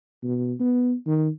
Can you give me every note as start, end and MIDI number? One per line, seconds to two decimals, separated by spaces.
0.24 0.54 47
0.60 0.94 59
1.06 1.29 51